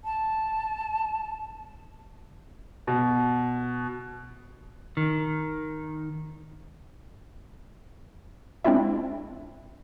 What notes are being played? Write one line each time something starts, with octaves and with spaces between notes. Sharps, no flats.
A5
B2
D#3
G#3 C4 D4 E4 F4 E5